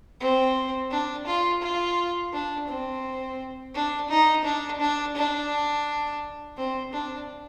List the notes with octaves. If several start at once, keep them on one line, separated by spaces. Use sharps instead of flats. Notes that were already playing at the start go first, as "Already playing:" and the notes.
C4
D4
F4
F4
D4
C4
D4
D#4
D4
D4
D4
C4
D4